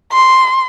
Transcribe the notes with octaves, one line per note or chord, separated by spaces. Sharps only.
C6